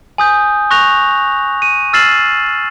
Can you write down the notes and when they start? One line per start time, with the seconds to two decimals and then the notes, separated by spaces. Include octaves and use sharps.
0.18 G#5 D#6 G6
0.71 C#6 F#6 A#6 F7
1.62 D#7
1.93 E6 F6 A6 C7 E7 F#7